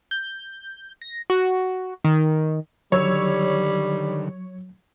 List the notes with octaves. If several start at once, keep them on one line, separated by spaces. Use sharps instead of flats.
G6
A#6
F#4
D#3
D3 D#3 F#3 G3 C#5 E6